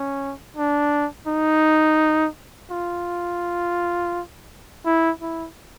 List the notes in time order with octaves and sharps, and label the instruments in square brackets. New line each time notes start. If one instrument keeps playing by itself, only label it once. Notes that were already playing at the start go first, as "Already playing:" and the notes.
Already playing: [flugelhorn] C#4
D4
D#4
F4
E4
E4